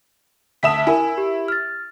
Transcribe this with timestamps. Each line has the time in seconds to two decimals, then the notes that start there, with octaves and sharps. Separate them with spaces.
0.63 D2 E5 A5 D#6 B6 E7
0.87 E4 A#4 G#5
1.18 G4
1.48 F6 A6